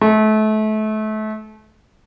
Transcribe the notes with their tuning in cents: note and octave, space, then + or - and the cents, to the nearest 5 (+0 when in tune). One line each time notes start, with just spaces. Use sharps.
A3 -30